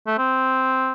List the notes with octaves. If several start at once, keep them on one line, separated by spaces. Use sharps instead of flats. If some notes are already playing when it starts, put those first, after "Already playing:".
A3
C4